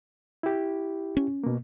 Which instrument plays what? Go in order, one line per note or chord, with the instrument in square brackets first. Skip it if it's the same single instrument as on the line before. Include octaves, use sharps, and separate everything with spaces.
[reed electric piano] E4 G4
[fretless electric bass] C#4
[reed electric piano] B2 A#3